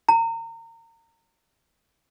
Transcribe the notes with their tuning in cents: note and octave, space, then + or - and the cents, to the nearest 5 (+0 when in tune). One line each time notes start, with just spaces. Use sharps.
A#5 -30